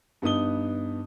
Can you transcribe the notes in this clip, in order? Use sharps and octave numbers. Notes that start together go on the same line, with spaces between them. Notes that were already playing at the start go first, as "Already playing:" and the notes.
G2 B3 D#4 D#6 G7